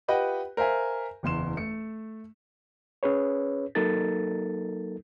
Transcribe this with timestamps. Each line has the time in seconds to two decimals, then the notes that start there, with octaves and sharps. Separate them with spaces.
0.08 F4 G4 B4 D#5 F#5 G5
0.57 A#4 C5 E5 F5 G#5
1.23 F#1 E2 C6 E7
1.57 A3 C#7
3.03 C#4 G#4 B4 C#5
3.75 F#3 A#3 D#4 A4 A#4 A6